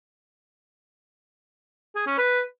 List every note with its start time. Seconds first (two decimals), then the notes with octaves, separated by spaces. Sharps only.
1.96 G#4
2.07 C#4
2.18 B4